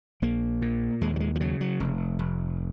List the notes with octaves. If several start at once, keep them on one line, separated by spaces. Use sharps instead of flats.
A#1 A#3
A#2
D#2 G#3
F#3
G#3
F3
C#3 F#3
F#3
F1
F1